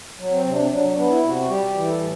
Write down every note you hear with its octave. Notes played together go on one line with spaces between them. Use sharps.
F#3
C4
C3
D4
F#3 D4
D4
B3
E4
C3
F#4
G3 G4
E3
A4
A2